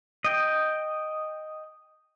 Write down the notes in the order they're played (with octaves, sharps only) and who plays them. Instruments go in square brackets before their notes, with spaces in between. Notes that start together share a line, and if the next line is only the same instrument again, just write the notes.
[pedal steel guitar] D#5 G5